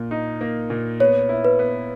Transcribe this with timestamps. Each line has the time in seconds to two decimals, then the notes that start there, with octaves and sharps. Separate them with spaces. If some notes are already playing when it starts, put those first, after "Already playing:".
Already playing: A#2
0.11 D#4
0.41 A#3
0.70 A#2
1.00 B3 C#5
1.29 E4
1.45 B4
1.59 B3